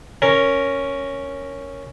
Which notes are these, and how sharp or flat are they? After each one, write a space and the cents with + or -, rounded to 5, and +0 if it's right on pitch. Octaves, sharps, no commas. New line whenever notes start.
C#4 +0 A#4 +0